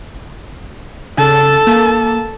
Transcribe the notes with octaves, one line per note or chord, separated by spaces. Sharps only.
C#3 A4 A5
A#3